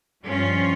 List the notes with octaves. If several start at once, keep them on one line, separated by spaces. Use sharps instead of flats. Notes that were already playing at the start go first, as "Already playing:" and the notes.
G2 F3 C#4 F4